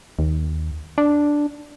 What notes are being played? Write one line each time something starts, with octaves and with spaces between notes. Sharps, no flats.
D#2
D4